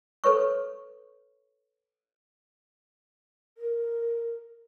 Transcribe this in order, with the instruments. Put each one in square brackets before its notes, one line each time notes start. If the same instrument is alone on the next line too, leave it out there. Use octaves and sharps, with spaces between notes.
[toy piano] A4 B4 C#5 C#6
[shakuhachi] A#4